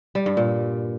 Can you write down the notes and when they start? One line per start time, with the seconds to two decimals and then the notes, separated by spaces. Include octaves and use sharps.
0.15 G3
0.26 G2
0.37 A#2